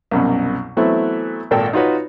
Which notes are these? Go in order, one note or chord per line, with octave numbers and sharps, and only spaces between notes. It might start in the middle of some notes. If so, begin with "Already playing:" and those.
C2 F#2 B2
E3 F#3 A3 B3 C4 E4
G#1 A#2 A4 G5
D#4 F4 F#4 B4 C#5